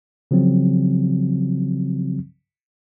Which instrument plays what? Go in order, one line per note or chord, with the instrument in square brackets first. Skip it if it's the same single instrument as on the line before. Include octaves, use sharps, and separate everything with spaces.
[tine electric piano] C#3 F3 F#3 C4